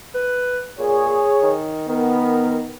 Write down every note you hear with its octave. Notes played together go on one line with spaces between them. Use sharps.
B4
A#2 G#4 C#5
D#3
D#3 B3 A#4